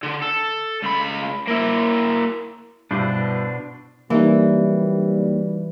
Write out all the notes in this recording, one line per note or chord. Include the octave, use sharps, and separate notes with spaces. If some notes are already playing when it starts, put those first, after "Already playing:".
D3
A4
C#2 B5
A#3 E4
G2 B2 D4 E4 B4 C5 D6
C2 E3 F#3 G3 A#3 D#4